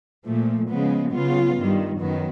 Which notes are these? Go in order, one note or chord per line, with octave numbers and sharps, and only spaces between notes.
A#2 F3 A3
C#3 F3 G#3 B3
C#3 F#3 B3 F4
G2 D#3 G3
F#2 D#3 F#3 B3